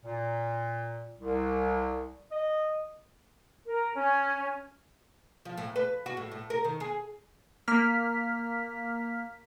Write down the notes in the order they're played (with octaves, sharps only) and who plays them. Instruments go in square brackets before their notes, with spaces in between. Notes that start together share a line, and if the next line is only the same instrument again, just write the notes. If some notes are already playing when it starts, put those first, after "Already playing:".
[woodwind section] A#2
C2
D#5
[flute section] A#4
C#4
[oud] F3
A2
B4
F#4
A2
A2
A#4
D#3
G#4
[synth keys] A#3 F6 B6